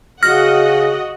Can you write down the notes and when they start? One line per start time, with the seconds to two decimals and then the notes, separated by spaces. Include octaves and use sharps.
0.23 C#3 F#4 D#5 F#5 F6 A#6